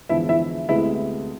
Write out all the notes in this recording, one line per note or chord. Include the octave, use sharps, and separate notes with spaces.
E2 D3 F3 G#3 B3 E4 E5
E4 E5
D2 C3 G#3 B3 E4 E5